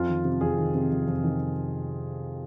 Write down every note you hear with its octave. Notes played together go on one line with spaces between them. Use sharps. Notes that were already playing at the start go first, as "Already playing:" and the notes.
Already playing: F2 F4
D#3
C3
F2 G#4
D#3
C3
F2
F2
D#3